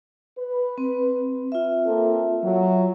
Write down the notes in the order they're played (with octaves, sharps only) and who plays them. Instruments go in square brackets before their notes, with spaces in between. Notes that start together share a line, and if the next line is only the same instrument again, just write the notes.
[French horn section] B4
[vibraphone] C4
F4 E5
[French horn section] A#3 C4 A4
F#3